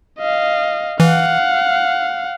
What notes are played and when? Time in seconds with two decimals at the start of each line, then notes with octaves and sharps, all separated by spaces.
0.19 D#5 F5
1.00 E3 F5 F#5